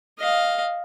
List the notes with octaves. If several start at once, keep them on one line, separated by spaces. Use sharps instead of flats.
D#5 F5